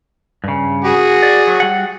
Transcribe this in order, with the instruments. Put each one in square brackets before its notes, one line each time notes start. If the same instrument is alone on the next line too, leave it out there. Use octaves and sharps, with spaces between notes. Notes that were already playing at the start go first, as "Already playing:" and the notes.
[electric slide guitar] G2 C#3
[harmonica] F#4 G#4
[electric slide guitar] D5
F#3
G3 F#5